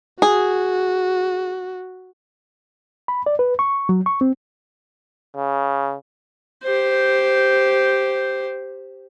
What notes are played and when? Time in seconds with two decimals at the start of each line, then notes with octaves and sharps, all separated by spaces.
0.22 F#4 G#4
3.08 B5
3.26 D5
3.39 B4
3.59 C#6
3.89 F#3
4.06 C#6
4.21 C4
5.36 C#3
6.64 G4 C5